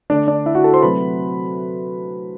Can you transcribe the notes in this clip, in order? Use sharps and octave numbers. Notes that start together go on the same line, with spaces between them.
D3 A3 D4 D5
D4 D5
E4 E5
F#4 F#5
A4 A5
C5 C6
C3 F#3 A3 B4 B5